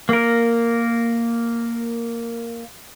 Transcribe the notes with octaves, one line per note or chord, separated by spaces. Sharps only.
A#3 A#4